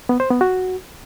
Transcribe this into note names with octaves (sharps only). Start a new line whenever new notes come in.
B3
C5
B3
F#4